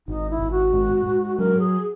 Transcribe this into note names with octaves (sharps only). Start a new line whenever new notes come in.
G#1 D#4
E4
G#1
F#4
G#2
G#2
F#3 A#4
G#4